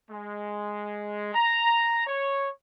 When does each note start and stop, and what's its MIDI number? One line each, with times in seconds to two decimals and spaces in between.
0.11 1.31 56
1.35 2.06 82
2.06 2.51 73